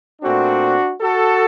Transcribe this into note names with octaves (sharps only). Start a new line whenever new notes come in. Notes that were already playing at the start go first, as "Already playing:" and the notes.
A#2 A3 C4 D4 F#4
F#4 A4